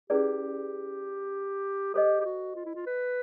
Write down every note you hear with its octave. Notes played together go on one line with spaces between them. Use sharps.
C#4 E4 G4 G#4 B4 D5
G4 A4 C5 D#5
G4
F#4
F4
E4
F4
B4